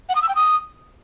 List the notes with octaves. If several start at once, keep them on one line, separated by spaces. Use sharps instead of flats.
F#5
D#6
E6
G5
D#6